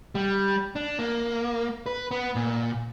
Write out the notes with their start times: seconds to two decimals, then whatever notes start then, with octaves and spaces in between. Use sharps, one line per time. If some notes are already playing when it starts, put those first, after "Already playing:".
0.15 G3
0.76 D4
0.99 A#3
1.86 B4
2.11 B3
2.36 A#2